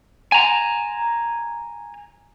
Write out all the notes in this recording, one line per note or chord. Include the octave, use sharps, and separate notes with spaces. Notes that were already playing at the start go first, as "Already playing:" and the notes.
G#5 A#5